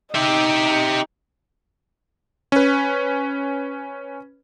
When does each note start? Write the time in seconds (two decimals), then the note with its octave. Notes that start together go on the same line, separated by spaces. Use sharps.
0.15 D#4 G4 E5
2.52 C#4 B4